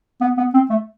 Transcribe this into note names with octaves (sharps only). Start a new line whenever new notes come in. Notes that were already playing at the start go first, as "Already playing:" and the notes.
B3
B3
C4
A3